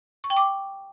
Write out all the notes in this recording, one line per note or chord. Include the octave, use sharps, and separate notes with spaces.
C#6
G5
D6